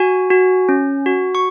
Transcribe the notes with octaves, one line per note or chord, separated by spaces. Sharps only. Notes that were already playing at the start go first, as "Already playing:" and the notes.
Already playing: F#4 G#5
F#4
C#4
F#4
C#6